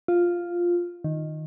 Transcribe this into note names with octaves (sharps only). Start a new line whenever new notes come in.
F4
D#3